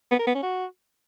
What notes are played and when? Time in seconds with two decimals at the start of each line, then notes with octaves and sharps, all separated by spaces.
0.11 B3
0.19 A#4
0.27 B3
0.35 C#4
0.43 F#4